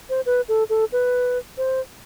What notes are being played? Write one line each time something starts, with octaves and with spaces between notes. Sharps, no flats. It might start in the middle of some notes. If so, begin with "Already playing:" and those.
C5
B4
A4
A4
B4
C5